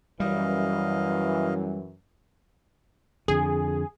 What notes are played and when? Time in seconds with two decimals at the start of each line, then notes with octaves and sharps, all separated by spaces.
0.20 F#2 E3 G3 D#5 F5
3.28 F2 D3 G#4